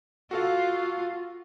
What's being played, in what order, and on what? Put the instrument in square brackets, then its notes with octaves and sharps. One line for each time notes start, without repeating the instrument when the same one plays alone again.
[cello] F4 [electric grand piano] F#4 A4 F5